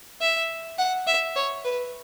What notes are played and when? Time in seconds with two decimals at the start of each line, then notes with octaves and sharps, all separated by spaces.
0.21 E5
0.79 F#5
1.07 E5
1.36 C#5
1.65 B4